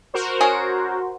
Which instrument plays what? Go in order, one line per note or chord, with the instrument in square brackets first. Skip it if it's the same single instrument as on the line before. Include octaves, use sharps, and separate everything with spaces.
[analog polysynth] F#4 A#4 C5
[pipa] C#4 G#4